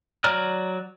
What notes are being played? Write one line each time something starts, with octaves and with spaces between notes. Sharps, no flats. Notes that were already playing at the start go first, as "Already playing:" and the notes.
F#3 D5 A#5 F6